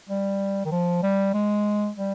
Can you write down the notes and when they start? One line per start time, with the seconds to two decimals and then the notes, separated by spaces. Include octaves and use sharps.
0.09 G3
0.65 D#3
0.71 F3
1.03 G3
1.34 G#3
1.97 G3